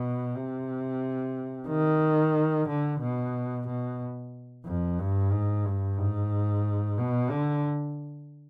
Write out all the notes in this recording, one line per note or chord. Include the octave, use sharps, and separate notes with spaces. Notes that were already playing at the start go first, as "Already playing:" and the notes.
Already playing: B2
C3
D#3
D3
B2
B2
F2
G2
G#2
G2
G#2
B2
D3